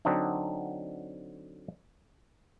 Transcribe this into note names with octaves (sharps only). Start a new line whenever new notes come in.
D3 F#3 C4 D4 D#4